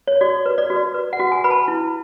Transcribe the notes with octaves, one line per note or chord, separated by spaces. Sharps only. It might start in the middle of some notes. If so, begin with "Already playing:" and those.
C#5
F#4 D5
B4
D5
F#4
D5
B4
F#5
F#4
G#5
B4 B5
A5
E4